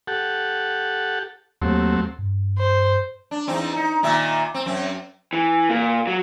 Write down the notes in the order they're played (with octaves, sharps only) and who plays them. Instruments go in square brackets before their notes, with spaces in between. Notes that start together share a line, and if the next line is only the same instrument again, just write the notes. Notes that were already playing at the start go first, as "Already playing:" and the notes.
[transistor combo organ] G4 A4 F#5
[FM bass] D#2 [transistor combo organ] F#3 A3 C4
[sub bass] G2
[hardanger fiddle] C5
[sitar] D4
E2 C4 D#4
D#4
A#2 D#3 E5
C4
F#2 C4
[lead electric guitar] E3
A#2
F#3